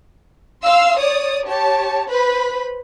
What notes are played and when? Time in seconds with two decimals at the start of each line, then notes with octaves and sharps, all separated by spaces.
0.64 F5 C6 E6
0.97 C#5 D5 D#6
1.46 G4 C#5 A5
2.08 B4 C5 B5